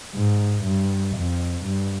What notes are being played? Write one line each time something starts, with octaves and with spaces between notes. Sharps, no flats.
G#2
G2
F2
G2